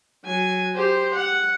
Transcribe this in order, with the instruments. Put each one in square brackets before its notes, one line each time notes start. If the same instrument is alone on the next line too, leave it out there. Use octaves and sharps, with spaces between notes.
[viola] F#3 G#5
G4 C5
F#5